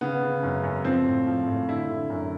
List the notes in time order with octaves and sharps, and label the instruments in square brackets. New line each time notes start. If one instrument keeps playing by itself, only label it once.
[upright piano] C#3 B3
C#3
F#2
F#2
F3 C4
A2
F3
A2
D3 E4
D3
F#2